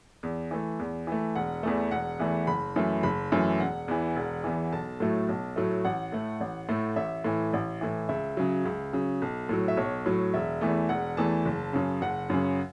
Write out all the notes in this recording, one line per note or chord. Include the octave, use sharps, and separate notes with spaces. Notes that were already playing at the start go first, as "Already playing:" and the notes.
E2
E3 A3
E2
E3 A3
E1 F#5
E2 E3 A3
E1 F#5
E2 E3 A3
F#1 B5
F#2 E3 A3
F#1 B5
F#2 E3 A3
E1 F#5
E2 E3
E1
E2 E3
B1 A5
A2 F#3 A3
B1
A2 F#3 A3
A1 F#5
A2 A3
A1
A2 A3
A1 E5
A2 E3
A1
A2 E3
C#2 E5
C#3 F#3
C#2
C#3 F#3
B1
A2 F#3
E5
B1 C#5
A2 F#3
E1 E5
E2 E3 A3
E1 F#5
E2 E3 A3 A5
F#1
F#2 C#3
F#1 F#5
F#2 C#3